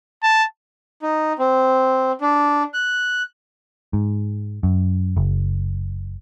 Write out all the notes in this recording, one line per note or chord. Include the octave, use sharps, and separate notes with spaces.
A5
D#4
C4
D4
F#6
G#2
F#2
F#1